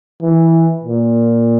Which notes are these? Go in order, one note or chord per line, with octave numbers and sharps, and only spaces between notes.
E3
A#2